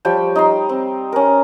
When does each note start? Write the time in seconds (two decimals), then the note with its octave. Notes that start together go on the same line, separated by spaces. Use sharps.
0.05 F3 G3 C#5 G5
0.36 D#4 A#5 C6
0.69 C4
1.12 C#4 A#4